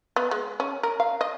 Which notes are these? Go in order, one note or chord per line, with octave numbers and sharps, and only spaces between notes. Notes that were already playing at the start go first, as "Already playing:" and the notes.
B3
G#3
C#4
A#4
F5
D#5